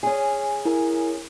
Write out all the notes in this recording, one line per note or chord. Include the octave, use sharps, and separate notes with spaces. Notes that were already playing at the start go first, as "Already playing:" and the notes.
C#4 G#4
E4 A#4 G#5